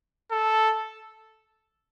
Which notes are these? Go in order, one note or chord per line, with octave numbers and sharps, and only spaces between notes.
A4